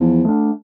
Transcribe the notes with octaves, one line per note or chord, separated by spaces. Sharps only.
E2 F3
A3 D4